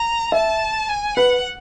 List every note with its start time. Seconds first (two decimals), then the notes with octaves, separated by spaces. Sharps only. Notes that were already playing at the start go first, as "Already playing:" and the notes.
Already playing: A#5
0.32 E5 A5
0.89 G#5
1.17 B4 F#5